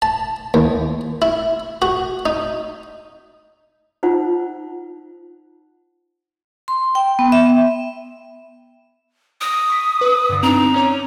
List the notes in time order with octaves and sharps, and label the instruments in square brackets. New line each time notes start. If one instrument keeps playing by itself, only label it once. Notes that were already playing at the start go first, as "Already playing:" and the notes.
[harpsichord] A5
D#2
E4
F#4
D#4
[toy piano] D#4 F4 C5 F#5
[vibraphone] C6
G5
B3
E5
[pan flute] D#6 [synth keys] A#6 D7
[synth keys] C#6 B6
B4
G2 D3
[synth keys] C4 D4 D#4 [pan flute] A#5
[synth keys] C#4 C#5 D6